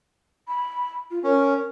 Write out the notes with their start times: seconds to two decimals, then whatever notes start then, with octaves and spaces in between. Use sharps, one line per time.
0.48 B5
1.11 F4
1.24 C#4 A#4